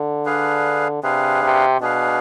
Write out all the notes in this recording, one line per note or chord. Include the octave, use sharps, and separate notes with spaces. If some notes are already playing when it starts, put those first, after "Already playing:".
Already playing: D3
D4 G#4 B4 F5
C3 D4 G#4 B4 F5
C3
B2 D4 G#4 B4 F5